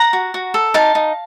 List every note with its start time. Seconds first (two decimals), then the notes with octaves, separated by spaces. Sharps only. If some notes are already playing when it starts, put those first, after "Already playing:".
Already playing: F#5 A#5
0.13 F#4
0.34 F#4
0.54 A4
0.74 D#4 F5 A5
0.95 D#4